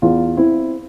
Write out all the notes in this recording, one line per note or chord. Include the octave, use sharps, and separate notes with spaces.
E2 F4
C4 E4